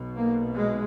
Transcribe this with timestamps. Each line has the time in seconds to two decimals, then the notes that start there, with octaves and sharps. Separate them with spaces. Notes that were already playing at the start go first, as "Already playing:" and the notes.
Already playing: B1 B2
0.16 A#3
0.55 G#3